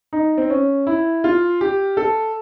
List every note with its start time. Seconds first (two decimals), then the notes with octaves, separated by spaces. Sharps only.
0.13 D#4
0.38 C4
0.50 C#4
0.87 E4
1.24 F4
1.61 G4
1.97 A4